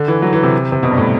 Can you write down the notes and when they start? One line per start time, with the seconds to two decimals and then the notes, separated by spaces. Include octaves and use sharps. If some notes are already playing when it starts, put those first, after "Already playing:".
Already playing: D3
0.08 E3
0.22 F#3
0.33 E3
0.43 C3
0.72 C3
0.83 B2
0.91 G2
0.98 A2